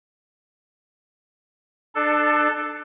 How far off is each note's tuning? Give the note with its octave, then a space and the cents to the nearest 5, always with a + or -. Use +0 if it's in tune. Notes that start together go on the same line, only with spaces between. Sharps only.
D4 +30 A4 +0